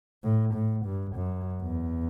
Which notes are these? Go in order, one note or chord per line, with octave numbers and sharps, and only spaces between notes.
A2
A2
G2
F#2
E2